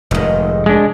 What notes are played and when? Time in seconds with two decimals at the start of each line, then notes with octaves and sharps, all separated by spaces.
0.11 F1 G#2 D#3
0.66 G#3 D4